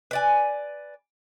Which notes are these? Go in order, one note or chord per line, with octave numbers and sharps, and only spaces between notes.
B4 D5 G#5